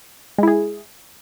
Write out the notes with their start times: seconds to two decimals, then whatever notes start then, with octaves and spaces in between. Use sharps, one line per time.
0.38 G#3
0.43 E4
0.48 G#4